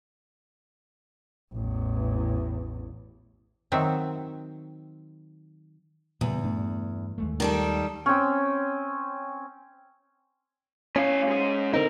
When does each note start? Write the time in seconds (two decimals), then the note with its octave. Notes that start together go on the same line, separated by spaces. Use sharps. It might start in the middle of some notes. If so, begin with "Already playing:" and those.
1.54 A1 E2
3.72 D#3 F#3 C4 E5
6.21 E2 A#2 C#3 G3
6.44 G2 A3 D4
7.18 D#2 G#3 A3
7.40 D#3 G3 A4
8.06 C4 C#4
10.96 A2 C#4 F5
11.27 G#2 G#4
11.74 D3 C4 D#4 A#4